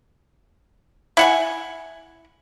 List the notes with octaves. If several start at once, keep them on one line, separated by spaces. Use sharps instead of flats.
E4 F#5 G#5